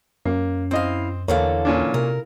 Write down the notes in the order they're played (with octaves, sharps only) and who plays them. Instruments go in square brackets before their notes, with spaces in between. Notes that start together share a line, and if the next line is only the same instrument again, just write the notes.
[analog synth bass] F#2 [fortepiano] A#3 [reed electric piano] C#4
[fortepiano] C4 D#5 [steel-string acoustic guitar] E4 F5
[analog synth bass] E2 [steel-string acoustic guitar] D3 E3 A4 [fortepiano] A#3 [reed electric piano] C#5 F5
[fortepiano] A#2 C#4 D4
[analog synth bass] C3 [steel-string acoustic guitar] A#4